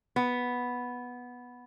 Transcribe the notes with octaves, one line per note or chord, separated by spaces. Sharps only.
B3